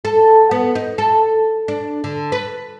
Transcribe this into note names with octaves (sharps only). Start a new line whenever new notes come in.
A4
B3
D#4
A4
D4
D3
B4